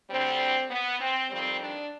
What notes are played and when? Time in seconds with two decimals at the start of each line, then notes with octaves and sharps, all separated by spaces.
0.11 D2 D3 G3 C4
0.70 B3
1.00 C4
1.30 F2 D#3 G3 C4
1.60 D4